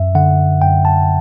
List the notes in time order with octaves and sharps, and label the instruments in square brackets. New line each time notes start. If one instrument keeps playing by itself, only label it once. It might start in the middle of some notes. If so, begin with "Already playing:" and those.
Already playing: [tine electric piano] F#2 E5
D3 F#5
F#2 G5
A5